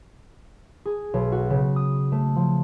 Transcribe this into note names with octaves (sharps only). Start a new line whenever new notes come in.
G#4
B1
F#4
C#3
D#6
A3
F3